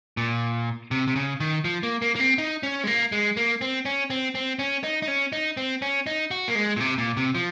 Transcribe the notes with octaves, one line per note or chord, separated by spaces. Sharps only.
A#2
C3
C3
C#3
D#3
F3
A#3
A#3
A#3
C4
D#4
C#4
G#3
A#3
G#3
A#3
C4
C#4
C4
C4
C#4
D#4
D#4
C#4
D#4
C4
C#4
D#4
F#4
A#3
G#3
A#2
C3
A#2
C3
F3